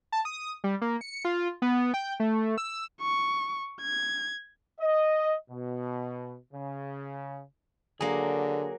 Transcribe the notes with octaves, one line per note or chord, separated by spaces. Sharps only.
A5
D#6
G3
A#3
C#7
F4
B3
G5
A3
E6
C#6
G#6
D#5
B2
C#3
D3 F#3 A#3 G#4